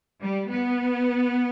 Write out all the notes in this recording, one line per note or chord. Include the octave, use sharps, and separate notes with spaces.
G3
B3